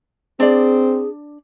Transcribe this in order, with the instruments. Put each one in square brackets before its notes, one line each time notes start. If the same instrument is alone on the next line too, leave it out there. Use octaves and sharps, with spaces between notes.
[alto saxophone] C4 [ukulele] D4 D5 [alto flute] G#4